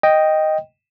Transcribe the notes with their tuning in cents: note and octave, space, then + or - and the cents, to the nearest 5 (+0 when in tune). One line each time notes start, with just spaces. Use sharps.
D#5 +0 G5 +0